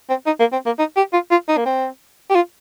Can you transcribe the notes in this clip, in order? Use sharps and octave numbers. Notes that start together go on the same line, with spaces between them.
C4
D#4
A#3
C4
A#3
D#4
G4
F4
F4
D#4
A#3
C4
G4
F4